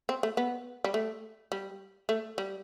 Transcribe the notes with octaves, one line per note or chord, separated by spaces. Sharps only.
C4
A3
B3
G3
A3
G3
A3
G3